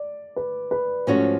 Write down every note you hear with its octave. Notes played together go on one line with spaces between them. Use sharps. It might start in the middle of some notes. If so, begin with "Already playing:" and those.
Already playing: D5
B4
B4
G#2 F3 A3 C#4 F#4 C#5